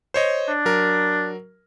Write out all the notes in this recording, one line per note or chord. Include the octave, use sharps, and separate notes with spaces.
C5 C#5 D#5
D4
F#3 A#4